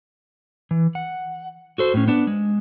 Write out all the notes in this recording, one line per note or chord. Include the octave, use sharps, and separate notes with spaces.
E3
F#5
F#4 A4 C5
A2 C#4
B3 D4
G#3